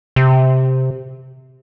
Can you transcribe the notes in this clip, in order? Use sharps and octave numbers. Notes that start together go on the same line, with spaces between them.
C3